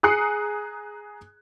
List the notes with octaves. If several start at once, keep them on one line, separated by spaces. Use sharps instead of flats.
G#4 A#5 D#6 F#6 C7 C#7